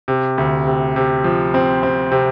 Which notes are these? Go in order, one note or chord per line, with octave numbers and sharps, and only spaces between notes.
C3
D2
C3
C3
F3
C4
C4
C3